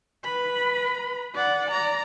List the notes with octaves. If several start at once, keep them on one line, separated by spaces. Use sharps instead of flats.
B4 B5
D5 F#5
D5 A#5